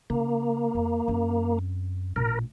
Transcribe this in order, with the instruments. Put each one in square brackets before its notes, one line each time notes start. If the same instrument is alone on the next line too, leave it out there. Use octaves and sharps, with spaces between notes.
[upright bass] C#3 [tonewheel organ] A#3
[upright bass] F2
F#2 C4
[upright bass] A1 A#2 [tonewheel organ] A#4